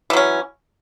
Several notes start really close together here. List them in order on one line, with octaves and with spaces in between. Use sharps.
E3 F#3 C#4